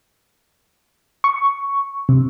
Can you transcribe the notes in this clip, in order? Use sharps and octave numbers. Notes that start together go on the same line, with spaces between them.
C#6
C3